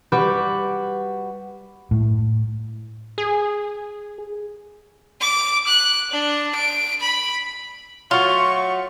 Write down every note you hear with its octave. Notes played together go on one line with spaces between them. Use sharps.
G3 F#4 B4 B5 D6 G6
A2
G#4
D6
F#6
D4
D7
B5
F#3 A3 F4 C#6